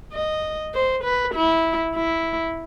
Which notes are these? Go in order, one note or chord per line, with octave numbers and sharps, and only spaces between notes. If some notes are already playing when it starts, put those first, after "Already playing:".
D#5
C5
B4
E4
E4